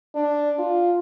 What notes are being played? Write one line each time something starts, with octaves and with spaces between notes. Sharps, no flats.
D4
F4